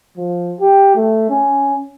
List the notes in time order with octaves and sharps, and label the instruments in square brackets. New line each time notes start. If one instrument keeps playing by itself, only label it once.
[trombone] F3
G4
A3
C#4